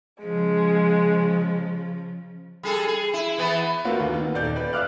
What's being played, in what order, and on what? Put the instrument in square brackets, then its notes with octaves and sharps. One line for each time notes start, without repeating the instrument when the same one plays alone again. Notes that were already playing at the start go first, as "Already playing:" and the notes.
[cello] C#3 F3 [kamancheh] G#3
[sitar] G3 G#4 A4
G#4
E4
E3 B3
[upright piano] A3 A#3 C4 F4 F#4 B4
D#2
D#3 B3
D#1 D5 G6
B4 D5
E5 F5 D6 F6 F#6